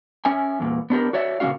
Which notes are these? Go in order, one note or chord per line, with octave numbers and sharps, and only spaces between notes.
C#4 E5 G#5
E2 A#2
B3 D4 G4 A#4
F#4 C#5 D5 E5
A#2 C#3 G3 C#4 F#4 F5